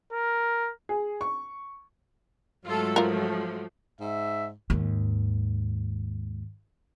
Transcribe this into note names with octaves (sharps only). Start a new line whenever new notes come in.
A#4
G#4
C#6
G#2 F#3 A3 F4 A4
F3 F4 A#4
G#2 E5
D#2 G#2